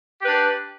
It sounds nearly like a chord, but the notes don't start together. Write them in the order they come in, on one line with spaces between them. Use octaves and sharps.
G4 B4 D4